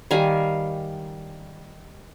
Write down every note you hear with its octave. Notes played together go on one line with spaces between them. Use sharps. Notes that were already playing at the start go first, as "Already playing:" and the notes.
D#3 G3 F5 G#5